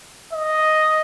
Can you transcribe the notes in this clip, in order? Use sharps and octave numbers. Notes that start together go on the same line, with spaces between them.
D#5